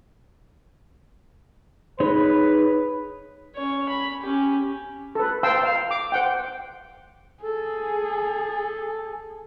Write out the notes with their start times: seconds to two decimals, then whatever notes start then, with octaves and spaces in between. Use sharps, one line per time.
2.00 D#4 G#4 B4 C#5
3.55 C#4 C#5
3.89 B5
4.21 C#4 G4
5.15 A4 B4
5.43 C5 F5 G5 A5 C6 E6
5.63 F5
5.91 D6
6.12 C5 F#5 G5
7.44 G#4 A4